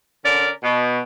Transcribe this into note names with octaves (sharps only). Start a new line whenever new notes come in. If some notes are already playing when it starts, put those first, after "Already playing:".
D3 C#4 A#4 D5
B2